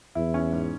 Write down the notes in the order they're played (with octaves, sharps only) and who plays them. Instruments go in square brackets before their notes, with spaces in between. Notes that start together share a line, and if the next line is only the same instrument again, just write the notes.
[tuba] E2 [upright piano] E4
[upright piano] C#4
G#2